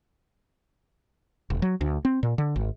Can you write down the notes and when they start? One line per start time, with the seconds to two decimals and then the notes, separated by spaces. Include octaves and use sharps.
1.50 E1
1.62 F#3
1.81 D2
2.05 C4
2.23 A#2
2.38 D3
2.56 G#1